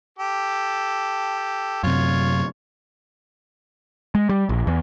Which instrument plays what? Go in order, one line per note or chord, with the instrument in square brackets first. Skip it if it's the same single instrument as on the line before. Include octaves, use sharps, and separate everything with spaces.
[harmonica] G4 A4
[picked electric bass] F#2 C3 [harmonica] F4 C#5
[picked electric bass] G#3
G3
A#1
E2